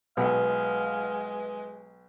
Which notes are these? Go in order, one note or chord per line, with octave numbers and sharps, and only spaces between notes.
B1 G#3 B4 F5